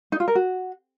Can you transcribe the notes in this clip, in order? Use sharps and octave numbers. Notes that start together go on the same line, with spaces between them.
D#4
F4
A#4
F#4